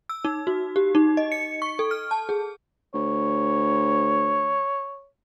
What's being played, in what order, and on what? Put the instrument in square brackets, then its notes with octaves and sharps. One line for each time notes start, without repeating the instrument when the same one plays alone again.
[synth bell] E6
D#4
F#4
G4
D#4
D#5
C#7
C#6
A4
F6
A5
G#4
[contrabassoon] D2 [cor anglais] C#5